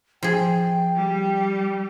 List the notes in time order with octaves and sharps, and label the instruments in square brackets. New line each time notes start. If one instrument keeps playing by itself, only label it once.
[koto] F3 G#4 [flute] G5
[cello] G3